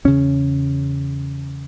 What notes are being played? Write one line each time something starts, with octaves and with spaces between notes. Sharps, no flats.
E2 C#3 C#4